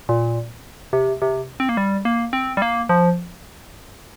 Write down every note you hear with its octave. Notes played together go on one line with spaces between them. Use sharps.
A#2
C3
C3
C4
A#3
G3
A#3
C4
G3
A#3
F3